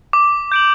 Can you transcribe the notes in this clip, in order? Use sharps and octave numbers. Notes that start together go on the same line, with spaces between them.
D6
G6 D7 F#7